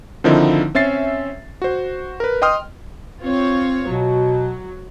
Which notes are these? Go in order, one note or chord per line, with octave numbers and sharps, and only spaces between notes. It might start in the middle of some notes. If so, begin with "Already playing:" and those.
D3 D#3 F3 C4 D#4 E4
C4 C#4 E5 A6 C7
F#4 C5
A#4 B4
D#5 G5 C6 D#6 F6
C4 F4 C#5
B2 F#3